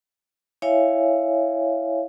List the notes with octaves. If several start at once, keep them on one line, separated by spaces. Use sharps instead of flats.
E4 C#5 E5 F5 G#5